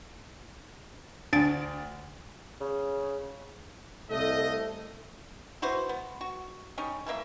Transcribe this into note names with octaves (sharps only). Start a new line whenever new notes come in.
D2 D4 A6 D7
C#3
C2 A3 A4 D#5
E4 F#4 B4 C5
B3
F#4
G3 C#4 D#4
E3 A3 A#3 E5